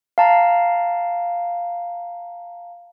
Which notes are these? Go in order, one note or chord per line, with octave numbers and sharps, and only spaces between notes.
F5 A5 A#5